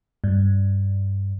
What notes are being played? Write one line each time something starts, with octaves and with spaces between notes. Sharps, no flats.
G2